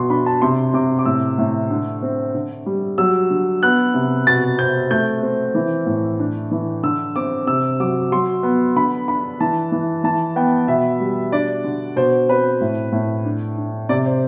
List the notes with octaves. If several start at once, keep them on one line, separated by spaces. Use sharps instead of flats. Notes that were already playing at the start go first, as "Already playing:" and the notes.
Already playing: B2 C6
D4 B5
A5
C3 C6
C3 D6
D6
A2 E6
A2
D3
C4
D3
G3
F#3 E6
D3
B3 F#6
C3
B2 A6
C4 G6
A3 G6
C4
E3
A2
D4
E3
D3 E6
C4 D6
C3 E6
F#3 D6
F#3 C6
B3
D3 B5
D4 B5
E3 A5
E3
E3 A5
B3 G5
B2 E5
G3
D4 D5
D3
B2 C5
C4 B4
A2
A2
D4
D4
C3 D5
C5